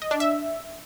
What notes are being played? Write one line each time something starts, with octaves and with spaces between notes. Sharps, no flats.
D#5
D4
E5